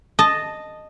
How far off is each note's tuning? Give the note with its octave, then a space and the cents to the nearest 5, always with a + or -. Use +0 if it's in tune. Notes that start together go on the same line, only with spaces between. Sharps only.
D#5 -10 A5 +0